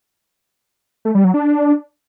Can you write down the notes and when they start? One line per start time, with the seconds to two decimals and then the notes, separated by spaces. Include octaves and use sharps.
1.05 A3
1.15 G3
1.24 F#3
1.34 D4